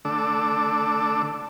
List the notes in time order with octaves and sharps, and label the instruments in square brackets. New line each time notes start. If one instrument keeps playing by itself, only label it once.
[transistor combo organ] D3 A3 D4 A4 D6 E6